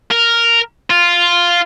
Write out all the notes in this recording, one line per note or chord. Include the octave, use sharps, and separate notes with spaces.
A#4
F4